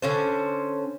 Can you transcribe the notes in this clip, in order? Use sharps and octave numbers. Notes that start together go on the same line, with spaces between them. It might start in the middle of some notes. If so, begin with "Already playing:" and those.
D3 C#4 C5